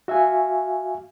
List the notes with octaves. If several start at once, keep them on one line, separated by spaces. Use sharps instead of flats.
F#4 E5 F5 G#5